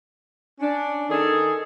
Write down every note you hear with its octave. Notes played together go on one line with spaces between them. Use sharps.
C#4 D4
D#3 D#4 G#4 A4